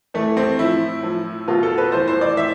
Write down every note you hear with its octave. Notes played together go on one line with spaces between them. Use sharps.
A2 E3 A3
C4
A2 F3 E4
A2 F3
B2 F4
A4
B4
A2 E3 C5
C5
D5
A2 E3 E5